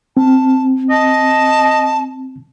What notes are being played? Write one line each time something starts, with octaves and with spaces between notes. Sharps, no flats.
C4 A5
D#5 A5